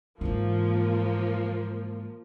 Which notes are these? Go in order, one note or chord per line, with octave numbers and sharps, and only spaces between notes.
G#2 E3 F3 A#3